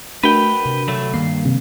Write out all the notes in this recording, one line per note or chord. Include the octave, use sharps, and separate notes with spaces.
A3 D4 F#4 A#4 B4 G5 B5
C3
D2 F#3 A3
G2 D#3 A#3 C7
C3